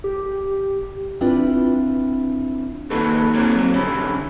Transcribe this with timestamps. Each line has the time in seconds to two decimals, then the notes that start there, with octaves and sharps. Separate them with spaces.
0.04 G4
1.21 C4 D4 E4 F4 B4
2.90 D#3 A#3 D#4 F#4 A4 B4
3.34 A#3 C4 F#4 A#4 C#5 D5
3.56 F#3 C4
3.74 A2 D3 G3 C#4 E4